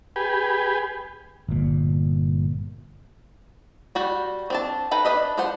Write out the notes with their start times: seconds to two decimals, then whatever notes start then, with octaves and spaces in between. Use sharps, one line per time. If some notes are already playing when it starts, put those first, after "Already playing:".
0.16 G4 G#4 B4
1.48 G1 A#2
3.95 G3 F#4 G5
4.50 C4 D4 A5
4.91 D#4 A4 B4 G5 A#5
5.05 D4 B4 D#5 E5
5.38 F3 D4 C5 F#5